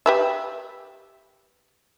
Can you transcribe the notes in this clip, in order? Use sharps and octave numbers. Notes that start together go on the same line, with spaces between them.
G4 B4 E5